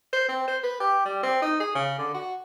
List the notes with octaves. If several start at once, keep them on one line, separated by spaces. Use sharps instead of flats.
C5
C4
C5
B4
G4
G3
C4
D#4
G#4
C#3
D3
F#4